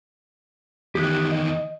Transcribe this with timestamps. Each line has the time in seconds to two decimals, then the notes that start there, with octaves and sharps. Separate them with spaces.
0.95 E2 D#3 G4 D#6 F#6
1.32 D#5